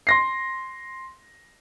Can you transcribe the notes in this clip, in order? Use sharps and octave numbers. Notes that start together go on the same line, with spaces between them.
C6 A#6 C7